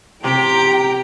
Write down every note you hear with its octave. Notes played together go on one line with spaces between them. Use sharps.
C3 G4 G5 A#5